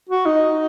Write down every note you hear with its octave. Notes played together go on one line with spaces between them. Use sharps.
F#4
D#4